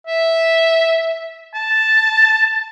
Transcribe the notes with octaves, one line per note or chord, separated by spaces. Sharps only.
E5
A5